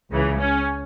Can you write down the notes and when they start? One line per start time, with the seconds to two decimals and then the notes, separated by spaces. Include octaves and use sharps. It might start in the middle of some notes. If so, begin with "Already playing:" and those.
0.10 C#2 C#3 E3
0.39 C#4